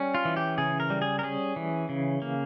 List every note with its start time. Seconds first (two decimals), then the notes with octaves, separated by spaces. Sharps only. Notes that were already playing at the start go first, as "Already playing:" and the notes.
Already playing: G3 C#4
0.15 F4
0.25 E3
0.37 G4
0.58 C#3 G#4
0.80 A#4
0.90 G3
1.02 G#4
1.19 A#4
1.23 C#4 G#4
1.56 E3
1.89 C#3
2.22 A#3